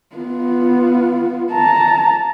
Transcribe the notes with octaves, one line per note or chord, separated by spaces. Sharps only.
B3 F4
A5 A#5